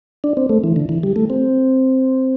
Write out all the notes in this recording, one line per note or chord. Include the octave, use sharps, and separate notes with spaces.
D4
C4
A3
E3
D3
E3
G3
A3
C4